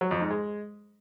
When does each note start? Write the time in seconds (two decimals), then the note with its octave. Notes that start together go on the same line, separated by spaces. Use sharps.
0.01 F#3
0.11 F2
0.21 G#2
0.31 G#3